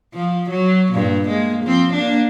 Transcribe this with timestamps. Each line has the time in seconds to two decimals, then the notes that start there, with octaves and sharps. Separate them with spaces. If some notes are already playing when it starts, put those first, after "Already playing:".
0.14 F3
0.50 F#3
0.93 G2 A#2
1.27 G#3 A#3
1.64 F3 C4
1.94 A#3 D4